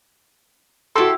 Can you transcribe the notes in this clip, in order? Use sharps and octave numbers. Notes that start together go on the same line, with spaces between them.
E4 F#4 G4 A4 C6